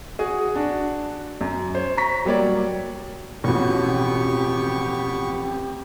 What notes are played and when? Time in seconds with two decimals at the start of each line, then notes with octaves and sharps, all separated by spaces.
0.19 F#4 G#4
0.55 D4 F#4
1.41 F#2
1.75 C5 C#5
1.97 A#5 C#6 B6
2.25 F#3 G3 A#3 C#5 D5
3.44 A1 F2 B2 B3 F#4 G4 C#6